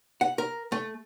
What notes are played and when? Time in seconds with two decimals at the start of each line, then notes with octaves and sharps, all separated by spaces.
0.21 F#5
0.38 A#4
0.72 A3